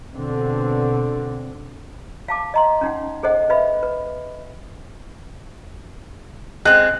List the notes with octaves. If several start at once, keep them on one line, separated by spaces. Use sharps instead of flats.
B2 D3 C4
F5 A5 D6
D#5 A#5 C6
C#4 D#4 F#5
G#4 A4 C5 D#5 F#5
B4 D#5 E5 B5
B4
G#3 C4 F#6